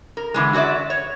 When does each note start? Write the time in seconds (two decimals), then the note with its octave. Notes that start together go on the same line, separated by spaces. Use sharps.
0.17 A#4
0.34 D3 E3 G#3
0.53 F#4 G#4 C#5 D5 E5
0.90 C#5